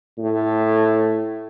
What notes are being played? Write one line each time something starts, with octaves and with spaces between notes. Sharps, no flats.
A2